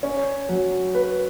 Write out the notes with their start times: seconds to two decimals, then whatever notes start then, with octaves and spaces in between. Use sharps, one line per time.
0.03 C#4
0.49 F#3
0.94 B4